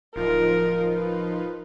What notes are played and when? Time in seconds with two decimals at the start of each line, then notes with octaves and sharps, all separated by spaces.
0.16 D1 F3 D#4 F4 A#4
0.93 B4